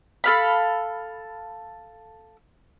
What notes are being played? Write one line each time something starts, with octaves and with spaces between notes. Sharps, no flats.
A4 F5 B5